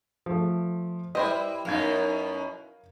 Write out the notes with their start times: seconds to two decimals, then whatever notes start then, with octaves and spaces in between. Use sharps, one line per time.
0.26 F3 A3
1.15 G3 E4 B4 C5 D#5
1.65 F#2 B2 D#4 A#4 F5 G#6